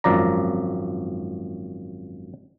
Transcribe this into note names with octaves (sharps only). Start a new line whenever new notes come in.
G#1 F#2 F3 D5 A#5